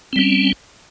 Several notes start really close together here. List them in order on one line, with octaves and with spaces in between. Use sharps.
C4 G3 C#4